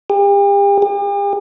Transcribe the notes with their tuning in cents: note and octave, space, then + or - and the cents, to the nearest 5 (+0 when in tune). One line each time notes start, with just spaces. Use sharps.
G4 +40
G4 +45